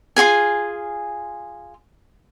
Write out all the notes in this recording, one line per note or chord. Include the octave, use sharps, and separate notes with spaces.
F4 F#4 G#4 G#5